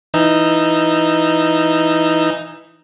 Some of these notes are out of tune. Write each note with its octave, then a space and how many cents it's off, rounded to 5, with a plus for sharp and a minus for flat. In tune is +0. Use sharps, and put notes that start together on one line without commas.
E3 +5 D#4 +0 E6 +25